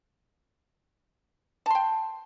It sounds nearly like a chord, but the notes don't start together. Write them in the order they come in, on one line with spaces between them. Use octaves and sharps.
A5 C6 G5